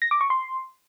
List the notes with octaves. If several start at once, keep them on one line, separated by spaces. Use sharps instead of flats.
A#6
D6
C#6
C6